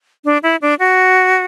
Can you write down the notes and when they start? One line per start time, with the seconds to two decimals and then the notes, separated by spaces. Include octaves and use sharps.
0.25 D4
0.43 E4
0.62 D4
0.79 F#4